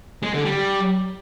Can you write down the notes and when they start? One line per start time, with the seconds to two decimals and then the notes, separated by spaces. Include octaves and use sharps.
0.23 G#3
0.34 D3
0.45 G3